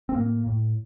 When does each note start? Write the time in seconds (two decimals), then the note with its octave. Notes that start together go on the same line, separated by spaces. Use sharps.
0.09 C4
0.15 A2 A#3
0.46 A2